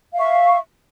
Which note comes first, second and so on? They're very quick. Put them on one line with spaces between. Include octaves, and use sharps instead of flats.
F5 E5 C#6